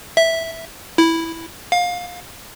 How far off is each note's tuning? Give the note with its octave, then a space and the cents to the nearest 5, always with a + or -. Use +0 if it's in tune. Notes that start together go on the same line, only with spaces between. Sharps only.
E5 -5
E4 -5
F5 +25